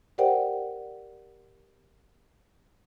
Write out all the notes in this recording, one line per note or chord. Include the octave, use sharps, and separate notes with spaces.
G4 A#4 C5 D5 F#5 G5